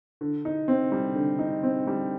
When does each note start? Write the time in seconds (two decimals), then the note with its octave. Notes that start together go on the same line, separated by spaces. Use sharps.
0.21 D3
0.45 D#4
0.68 C4
0.92 G3
1.15 D3
1.39 D#4
1.63 C4
1.87 G3